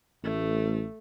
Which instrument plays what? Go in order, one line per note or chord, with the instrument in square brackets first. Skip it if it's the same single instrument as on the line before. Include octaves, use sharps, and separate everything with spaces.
[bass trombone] A1 [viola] A3